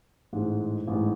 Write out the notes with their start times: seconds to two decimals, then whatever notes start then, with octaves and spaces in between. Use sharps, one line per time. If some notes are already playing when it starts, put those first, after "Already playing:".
0.33 A1 G#2 G#3
0.87 A1 G#2 G#3